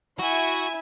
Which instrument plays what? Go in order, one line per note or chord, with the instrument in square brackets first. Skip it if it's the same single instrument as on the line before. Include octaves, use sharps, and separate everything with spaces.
[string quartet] E4 [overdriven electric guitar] F#4 [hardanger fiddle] E5 G#5